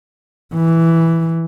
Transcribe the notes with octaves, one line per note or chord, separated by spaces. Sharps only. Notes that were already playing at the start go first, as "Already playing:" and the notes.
E3